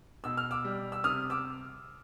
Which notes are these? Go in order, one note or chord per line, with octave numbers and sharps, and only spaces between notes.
B2 E6
F6
D6 E6
G3
E6
C3 D#6 F6
D6 E6